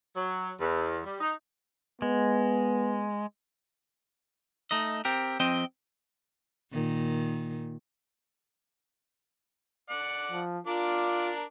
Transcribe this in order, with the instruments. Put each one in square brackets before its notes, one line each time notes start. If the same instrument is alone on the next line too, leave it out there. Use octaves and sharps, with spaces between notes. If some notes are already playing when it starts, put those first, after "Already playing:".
[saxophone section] F#3
E2
G3
D#4
[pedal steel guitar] G#3 [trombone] B3
[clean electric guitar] A3 D#4 D#5
C4 G4 A#4
F2 C4 D#5 G5
[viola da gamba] A#2 D#3
[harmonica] D5 F#5
[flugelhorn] F3
[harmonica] D4 A#4 D5 [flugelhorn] F4